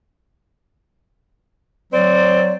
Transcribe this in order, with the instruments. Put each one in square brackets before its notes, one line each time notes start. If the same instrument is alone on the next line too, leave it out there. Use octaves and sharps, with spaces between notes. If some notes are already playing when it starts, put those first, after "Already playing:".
[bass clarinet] F#3 [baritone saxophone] C4 [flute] D5